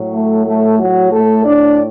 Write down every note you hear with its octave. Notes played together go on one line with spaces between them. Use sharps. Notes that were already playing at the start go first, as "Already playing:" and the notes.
Already playing: A2 F#3
A3 A4
A3 A4
F#3 F#4
A3 A4
D4 D5